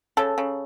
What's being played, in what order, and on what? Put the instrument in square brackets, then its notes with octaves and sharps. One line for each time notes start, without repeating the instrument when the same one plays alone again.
[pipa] C#3 A4
C#3